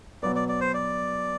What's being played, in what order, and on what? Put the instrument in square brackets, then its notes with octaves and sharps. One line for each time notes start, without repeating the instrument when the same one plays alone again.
[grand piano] B2 F#3 B3 [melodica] D5
[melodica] D5
D5
C5
D5